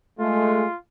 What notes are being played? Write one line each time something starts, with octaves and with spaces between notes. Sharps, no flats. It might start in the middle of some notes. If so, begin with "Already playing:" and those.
G#3 A3 F4